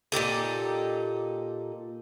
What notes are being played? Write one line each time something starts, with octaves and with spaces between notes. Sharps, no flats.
A#2 D#4 G4 A4